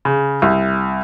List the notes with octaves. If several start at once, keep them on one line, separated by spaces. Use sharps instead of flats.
C#3
C2